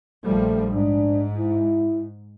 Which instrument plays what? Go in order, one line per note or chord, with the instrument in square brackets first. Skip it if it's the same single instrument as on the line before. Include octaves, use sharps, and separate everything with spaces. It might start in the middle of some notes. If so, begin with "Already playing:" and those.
[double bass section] A#1 F3 G3 [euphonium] A3
[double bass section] G#2 [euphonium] D4
[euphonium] E4